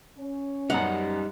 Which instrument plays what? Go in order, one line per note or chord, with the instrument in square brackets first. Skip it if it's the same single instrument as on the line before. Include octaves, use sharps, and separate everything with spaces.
[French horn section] C#4
[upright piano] F#2 B3 G4 [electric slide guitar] G3 D#4 [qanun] F#5